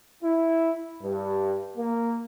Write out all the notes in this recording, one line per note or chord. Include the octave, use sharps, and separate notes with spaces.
E4
G2
A#3